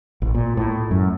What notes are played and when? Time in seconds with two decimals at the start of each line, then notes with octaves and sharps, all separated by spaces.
0.22 A1
0.35 A#2
0.57 A2
0.91 F#2